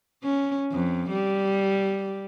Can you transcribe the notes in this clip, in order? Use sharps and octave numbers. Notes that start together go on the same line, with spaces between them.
C#4
F2
G3